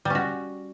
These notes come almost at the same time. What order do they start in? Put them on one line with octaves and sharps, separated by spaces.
G3 C#4 F#4